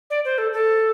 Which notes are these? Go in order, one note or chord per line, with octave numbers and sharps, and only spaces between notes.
D5
C5
A4
A4